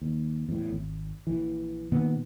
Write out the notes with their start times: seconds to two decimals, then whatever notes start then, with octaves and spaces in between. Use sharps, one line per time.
0.01 D#2
0.49 E2 A2
0.70 G#1
1.27 A#1 E3
1.92 A#2 D#3 B3